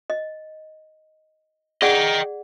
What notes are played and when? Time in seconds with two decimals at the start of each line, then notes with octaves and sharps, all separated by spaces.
0.10 D#5
1.82 G#4 D5 D#5 F#5 G5